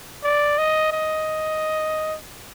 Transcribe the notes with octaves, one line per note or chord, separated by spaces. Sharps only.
D5
D#5
D#5